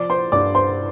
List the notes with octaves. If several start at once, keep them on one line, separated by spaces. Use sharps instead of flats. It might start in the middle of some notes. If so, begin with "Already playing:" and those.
Already playing: F3 D5 D6
C5 C6
G2 D5 D6
C5 C6